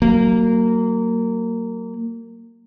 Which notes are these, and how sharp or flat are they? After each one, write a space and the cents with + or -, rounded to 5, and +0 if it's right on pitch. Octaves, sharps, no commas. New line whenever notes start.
F#3 +25 A#3 -20